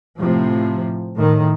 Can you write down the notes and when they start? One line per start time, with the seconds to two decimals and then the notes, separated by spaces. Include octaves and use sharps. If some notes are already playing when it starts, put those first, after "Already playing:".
0.19 A2 C3 F3
1.17 A2 D#3